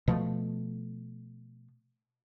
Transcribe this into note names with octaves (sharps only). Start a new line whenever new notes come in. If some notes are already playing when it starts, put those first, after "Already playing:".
B2 F3 A3